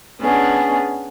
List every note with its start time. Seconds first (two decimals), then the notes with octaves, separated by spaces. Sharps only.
0.19 B3 C#4 D4 G#4